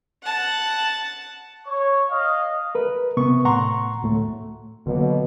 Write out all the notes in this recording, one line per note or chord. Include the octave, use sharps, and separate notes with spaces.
F#5 A5
C#5 C#6
D#5 F5
A#4 B4
C3 B3 C#6
A2 F#5 A#5 C6 C#6
D2 A2 A3
B2 D3 F#3 A#3